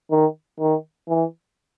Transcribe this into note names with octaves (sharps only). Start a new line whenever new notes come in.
D#3
D#3
E3